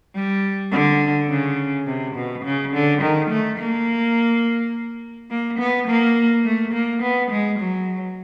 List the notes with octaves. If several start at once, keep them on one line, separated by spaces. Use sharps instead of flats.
G3
D3
C#3
C3
B2
C#3
D3
D#3
A3
A#3
A#3
B3
A#3
A3
A#3
B3
G#3
F#3